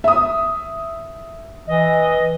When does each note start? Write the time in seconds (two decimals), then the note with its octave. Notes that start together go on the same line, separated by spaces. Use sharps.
0.04 E5 D#6
1.67 E3 D#5